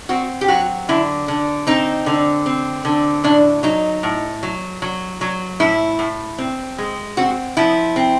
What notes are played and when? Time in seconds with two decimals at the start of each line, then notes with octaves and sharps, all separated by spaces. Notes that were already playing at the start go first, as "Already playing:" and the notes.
0.09 C4 F#4
0.41 G4
0.48 F#3 F#4
0.89 D3 E4
1.28 D3
1.67 C4 D#4
2.06 D3
2.46 C4
2.85 D3
3.24 A2 D4
3.63 F#3 D#4
4.03 A2
4.43 F#3
4.82 F#3
5.21 F#3
5.60 A2 E4
5.99 A2
6.38 C4
6.78 G#3
7.17 C4 F#4
7.57 F3 E4
7.96 C4